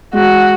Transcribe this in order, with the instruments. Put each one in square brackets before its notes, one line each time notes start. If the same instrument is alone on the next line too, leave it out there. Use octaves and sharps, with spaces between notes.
[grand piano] G#3 [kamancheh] F#4